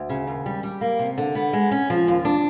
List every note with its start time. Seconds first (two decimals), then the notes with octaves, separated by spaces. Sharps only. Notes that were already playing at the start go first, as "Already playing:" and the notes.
Already playing: D2
0.09 C#3
0.27 D#2
0.46 G3
0.63 G3
0.81 A#3
0.99 C3
1.18 D3
1.35 B3
1.53 G#3
1.71 C#4
1.90 F3
2.08 D#2
2.25 D4